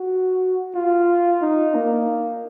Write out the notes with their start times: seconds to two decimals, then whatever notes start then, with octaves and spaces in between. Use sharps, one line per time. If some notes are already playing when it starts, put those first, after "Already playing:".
Already playing: F#4
0.75 F4
1.42 D#4
1.75 A#3